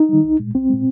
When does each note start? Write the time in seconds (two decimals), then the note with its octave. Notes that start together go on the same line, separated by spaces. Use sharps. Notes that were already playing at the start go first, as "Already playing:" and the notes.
Already playing: D#4
0.09 D#3 G3
0.24 C2
0.40 A#2 G#3
0.54 C2 C4
0.70 A#2 G#3